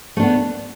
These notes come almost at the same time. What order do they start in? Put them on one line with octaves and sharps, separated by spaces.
A3 D4 B3